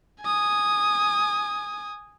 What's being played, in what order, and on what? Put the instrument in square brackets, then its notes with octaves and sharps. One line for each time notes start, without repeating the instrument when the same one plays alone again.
[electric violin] G#5 D#6